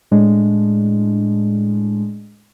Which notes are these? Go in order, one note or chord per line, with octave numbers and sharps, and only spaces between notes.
A2 G#3 D4